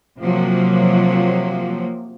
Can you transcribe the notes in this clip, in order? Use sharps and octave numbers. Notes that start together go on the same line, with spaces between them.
C3 F3 F#3 A#3